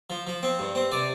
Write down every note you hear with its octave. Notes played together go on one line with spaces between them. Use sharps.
F3
F3
C4
G2
C4
C3 D5